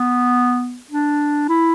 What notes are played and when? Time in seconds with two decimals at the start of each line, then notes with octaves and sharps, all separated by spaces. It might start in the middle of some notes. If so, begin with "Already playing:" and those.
Already playing: B3
0.91 D4
1.49 E4